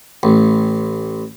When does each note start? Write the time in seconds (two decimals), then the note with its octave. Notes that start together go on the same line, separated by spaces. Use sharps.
0.23 A1